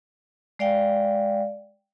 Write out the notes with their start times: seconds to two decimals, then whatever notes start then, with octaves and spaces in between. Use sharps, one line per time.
0.59 G#3 D5 F5 G5